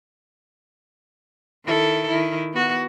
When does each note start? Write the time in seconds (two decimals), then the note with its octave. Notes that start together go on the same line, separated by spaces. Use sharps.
1.65 D#3 E4 A4
2.08 D#3 E4
2.53 B3 F#4